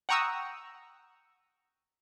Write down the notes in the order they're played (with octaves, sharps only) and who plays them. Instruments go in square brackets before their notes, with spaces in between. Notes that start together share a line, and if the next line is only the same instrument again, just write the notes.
[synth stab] F#5 G5 A#5 C#6 D#6 E6